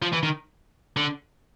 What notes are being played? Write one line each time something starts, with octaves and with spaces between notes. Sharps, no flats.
F3
E3
D#3
D3